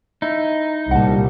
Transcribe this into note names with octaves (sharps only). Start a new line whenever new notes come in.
D#4 E4
C2 A#2 G3 F#5 A5